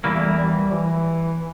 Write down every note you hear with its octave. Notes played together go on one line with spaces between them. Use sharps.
E2 E3 G3 A#3
A3
G3
G3
E3